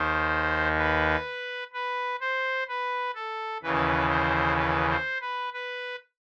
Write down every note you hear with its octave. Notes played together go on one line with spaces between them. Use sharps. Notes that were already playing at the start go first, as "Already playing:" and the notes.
Already playing: D#2 D#3 C5
B4
B4
C5
B4
A4
D#2 C#3 E3 B4
C5
B4
C5
B4
B4